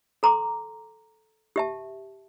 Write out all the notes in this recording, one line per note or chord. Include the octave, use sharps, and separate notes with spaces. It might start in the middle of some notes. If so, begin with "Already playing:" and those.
A4 A#5 C6 D6
G4 E5 A5